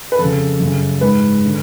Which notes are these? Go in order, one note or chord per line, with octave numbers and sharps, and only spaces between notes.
B4
F2 C#3 A4
F#2 C#3
G#2 B4
D3